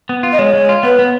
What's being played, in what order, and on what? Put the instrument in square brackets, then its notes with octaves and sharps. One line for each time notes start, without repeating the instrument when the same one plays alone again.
[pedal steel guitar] B3
F4
[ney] D#5
[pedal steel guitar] G#3 [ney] C#5
[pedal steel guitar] G#3
F4
[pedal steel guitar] B3 [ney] B4
[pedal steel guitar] B3